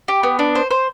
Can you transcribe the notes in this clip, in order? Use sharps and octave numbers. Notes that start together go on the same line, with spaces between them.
G4
B3
D4
C5
C5